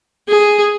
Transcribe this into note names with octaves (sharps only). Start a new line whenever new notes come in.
G#4